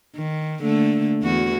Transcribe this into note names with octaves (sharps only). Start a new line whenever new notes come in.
D#3
D3 A3 A#3
E2 F#4